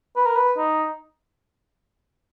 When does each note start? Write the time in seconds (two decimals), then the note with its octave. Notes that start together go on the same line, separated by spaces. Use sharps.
0.16 B4
0.26 A#4
0.36 B4
0.58 D#4